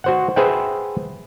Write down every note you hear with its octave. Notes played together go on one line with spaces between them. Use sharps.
F#4 C5 F#5
G#4 B4 C5 E5 F#5 G5